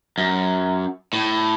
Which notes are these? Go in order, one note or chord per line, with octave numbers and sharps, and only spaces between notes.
F#2
A2